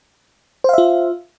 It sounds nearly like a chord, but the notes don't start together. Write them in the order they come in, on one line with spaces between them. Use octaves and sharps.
C5 F5 E5 F4